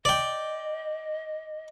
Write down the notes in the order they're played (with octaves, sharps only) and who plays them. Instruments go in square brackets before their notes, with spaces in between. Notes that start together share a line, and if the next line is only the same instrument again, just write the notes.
[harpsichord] D5 G5 [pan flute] D#5